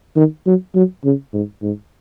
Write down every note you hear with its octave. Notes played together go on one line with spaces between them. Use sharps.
D#3
F#3
F#3
C#3
G#2
G#2